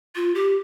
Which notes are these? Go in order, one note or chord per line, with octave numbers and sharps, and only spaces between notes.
F4
G4